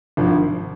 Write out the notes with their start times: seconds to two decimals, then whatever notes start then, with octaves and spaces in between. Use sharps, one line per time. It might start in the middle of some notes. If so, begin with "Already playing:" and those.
0.17 G#1 G2 F3